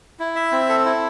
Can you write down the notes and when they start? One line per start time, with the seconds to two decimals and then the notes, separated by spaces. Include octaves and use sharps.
0.19 E4
0.36 E5
0.52 C4
0.69 A4
0.85 E4